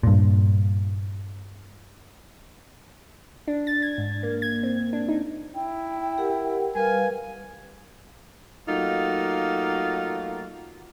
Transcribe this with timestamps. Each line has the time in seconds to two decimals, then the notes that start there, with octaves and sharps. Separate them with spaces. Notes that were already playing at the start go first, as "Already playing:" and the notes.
0.03 G2 A#2
3.48 D4
3.67 A6
3.82 G#6
3.98 G#2
4.23 A#3
4.42 G#6
4.63 C4
4.93 D4
5.08 D#4
5.55 E4 G5
6.18 G4 A#4 F#5
6.75 G3 A#4 B4 F5 G#5
8.68 F#3 A3 A#3 D#4 F4